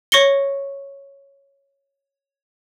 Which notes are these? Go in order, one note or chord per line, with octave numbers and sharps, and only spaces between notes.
C#5 C#6 A#6 C#7 G7